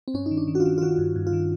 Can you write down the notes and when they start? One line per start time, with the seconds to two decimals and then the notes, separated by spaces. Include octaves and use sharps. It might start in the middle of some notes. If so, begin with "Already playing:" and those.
0.08 C4
0.14 G2 C#4
0.26 D#4
0.31 D#3
0.37 D4
0.48 D#3
0.55 F#4
0.60 F4
0.65 D#3
0.78 F4
0.82 D#3 F#4
0.98 G2
1.16 G2
1.27 F4
1.33 D#3